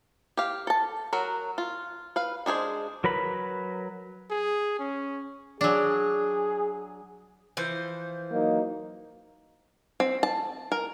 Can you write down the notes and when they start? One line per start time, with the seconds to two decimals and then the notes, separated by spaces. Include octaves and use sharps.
0.37 G4 F5
0.67 A4 A5
1.13 F#3 F#4 A#4
1.58 F4
2.16 B4 F5
2.46 G#3 D4 G#4 C5
3.04 F#3 A#4 B4 B5
4.30 G#4
4.79 C#4
5.61 F#3 D4 G#4
7.57 E3 F3 C5
8.31 F#3 A#3 D#4
10.00 C4
10.23 A5
10.72 A#4